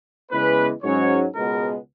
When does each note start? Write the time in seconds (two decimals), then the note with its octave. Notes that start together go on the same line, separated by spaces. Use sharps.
0.32 E2 C#3 E3 G#3 B3 B4
0.83 G#2 F#3 C#4 C#5
1.35 C#2 B2 G#3 B3 A#4